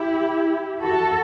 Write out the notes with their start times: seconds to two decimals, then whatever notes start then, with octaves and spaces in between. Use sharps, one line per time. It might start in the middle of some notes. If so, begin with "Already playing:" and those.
Already playing: E4 G4
0.81 F#4 A4